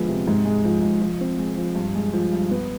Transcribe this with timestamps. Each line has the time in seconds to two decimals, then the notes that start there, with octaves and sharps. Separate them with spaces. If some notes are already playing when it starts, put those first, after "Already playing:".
Already playing: D3 F3 G#3 B3
0.08 C3
0.27 G#2
0.45 G#3
0.64 F3
0.83 G#2
1.01 F3
1.21 C4
1.38 G#3
1.57 F3
1.75 G2
1.95 G#3
2.13 F3
2.32 G2
2.51 B3